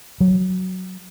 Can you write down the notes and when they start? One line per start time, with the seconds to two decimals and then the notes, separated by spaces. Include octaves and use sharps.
0.21 F#3